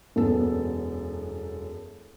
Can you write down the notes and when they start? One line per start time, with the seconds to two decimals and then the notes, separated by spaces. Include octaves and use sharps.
0.16 E1 F#2 B3 A4